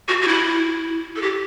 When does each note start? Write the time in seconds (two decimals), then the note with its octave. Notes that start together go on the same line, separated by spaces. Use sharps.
0.08 F#4
0.22 F#4
0.28 E4
1.16 A4
1.22 G4